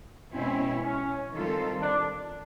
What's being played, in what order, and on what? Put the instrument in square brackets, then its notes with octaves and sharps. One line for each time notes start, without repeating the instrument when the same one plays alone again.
[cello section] B2 G#3 C#4 E4 [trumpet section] C4
[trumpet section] C#4
[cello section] D#3 G3 C4 F4 A4
[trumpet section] D4